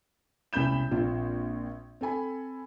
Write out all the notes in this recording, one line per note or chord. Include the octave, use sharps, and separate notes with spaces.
E1 C2 C#4 B5 G6 E7
A#1 C4 F4
C4 A4 G#5 B5